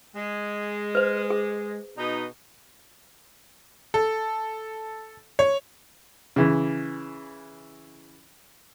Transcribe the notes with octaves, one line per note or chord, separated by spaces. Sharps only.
G#3
B4 C5
G#4
B2 D#4
A4
C#5
C#3 E3